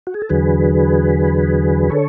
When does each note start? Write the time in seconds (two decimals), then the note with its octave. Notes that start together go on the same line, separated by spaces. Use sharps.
0.07 F#4
0.14 G#4
0.22 A4
0.29 E2 D3 F#3 G#4 B4
1.90 D3 A4 C#5